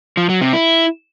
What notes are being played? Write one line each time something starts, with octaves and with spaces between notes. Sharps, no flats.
F3
F#3
C3
E4